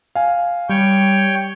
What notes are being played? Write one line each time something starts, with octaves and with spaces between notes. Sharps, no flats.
F5 G#5
G3 C#5 G5